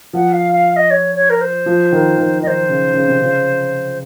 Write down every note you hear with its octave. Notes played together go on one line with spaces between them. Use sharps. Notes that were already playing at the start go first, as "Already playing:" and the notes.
F3 F#5
F5
F5
F5
D#5
C#5
C#5
A#4
C5
F3
D#3
D#3
D#3 C5 D#5
C#3
C#3
C3
C#3